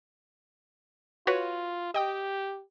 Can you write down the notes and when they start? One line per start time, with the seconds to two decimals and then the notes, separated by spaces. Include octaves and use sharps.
1.27 F4 F#4 B4 C#5
1.94 G4 D#5 G5 D#6